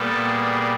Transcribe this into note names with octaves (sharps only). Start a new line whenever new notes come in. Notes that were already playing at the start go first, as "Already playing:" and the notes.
Already playing: A#2 G3 B3 A4
G#4